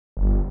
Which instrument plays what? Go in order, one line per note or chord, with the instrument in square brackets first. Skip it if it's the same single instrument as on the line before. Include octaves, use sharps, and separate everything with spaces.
[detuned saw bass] G1